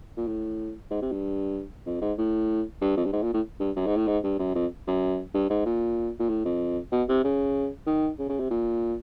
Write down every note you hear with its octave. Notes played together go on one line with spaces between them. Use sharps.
A#2
A2
G#2
C3
G2
F2
G#2
A2
G2
F2
G2
G#2
A#2
A2
G2
F#2
G#2
A2
G#2
G2
F#2
F2
F#2
G2
G#2
A#2
A#2
A2
F2
B2
C3
C#3
D#3
C#3
C#3
C3
A#2